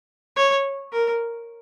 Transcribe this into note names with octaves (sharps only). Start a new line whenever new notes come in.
C#5
A#4